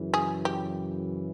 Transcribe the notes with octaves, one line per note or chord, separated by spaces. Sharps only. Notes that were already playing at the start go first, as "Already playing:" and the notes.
Already playing: F#2 C#3 E3
G#4
G4